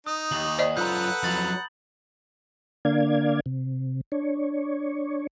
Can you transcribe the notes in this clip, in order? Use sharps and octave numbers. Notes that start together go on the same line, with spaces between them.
D#4 D#6
D#2 F#7
C5 D5 D#5
F#2 F4 A4 B4 F#5 A#5 G6
F2 F#3 B5 A6 F#7
D3 A#3 D4 D5 F5 G#6
C3
D4 C#5